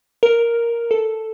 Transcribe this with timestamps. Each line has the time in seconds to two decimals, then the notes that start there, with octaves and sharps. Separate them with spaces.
0.23 A#4
0.91 A4